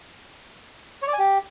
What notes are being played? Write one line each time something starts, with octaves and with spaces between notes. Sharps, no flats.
C#5
D5
G#5
G4